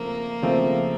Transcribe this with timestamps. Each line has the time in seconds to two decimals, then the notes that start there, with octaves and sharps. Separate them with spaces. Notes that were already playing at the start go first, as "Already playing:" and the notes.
Already playing: C#3 F3 A3 A#3 C4
0.42 C#3 F3 A3 C4